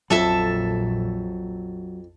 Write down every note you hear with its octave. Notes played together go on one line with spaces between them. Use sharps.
A#1 F2 F#3 A4 E5 A5